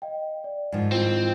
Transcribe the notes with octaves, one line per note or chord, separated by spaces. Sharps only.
D#5 F5 G5
D5
G#2 D#3 F3
C4 E4 F4